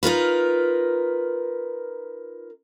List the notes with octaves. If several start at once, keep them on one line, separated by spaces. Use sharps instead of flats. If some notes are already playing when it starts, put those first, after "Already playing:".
D#4 F4 A#4 B4